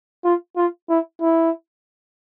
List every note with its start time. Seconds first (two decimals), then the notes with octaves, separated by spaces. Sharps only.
0.25 F4
0.57 F4
0.89 E4
1.22 E4